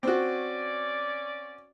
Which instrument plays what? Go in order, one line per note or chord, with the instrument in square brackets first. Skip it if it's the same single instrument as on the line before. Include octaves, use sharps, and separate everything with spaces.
[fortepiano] C4 F#4 [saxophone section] C#4 D5